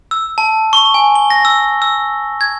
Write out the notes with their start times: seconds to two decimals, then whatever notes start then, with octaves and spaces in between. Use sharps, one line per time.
0.11 E6
0.38 A5
0.73 C#6
0.94 G#5
1.15 G7
1.30 A#6
1.45 E6
1.82 E6
2.41 G#6